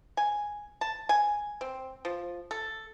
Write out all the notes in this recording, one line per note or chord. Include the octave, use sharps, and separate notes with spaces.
G#5
A5
G#5
C4
F3
A4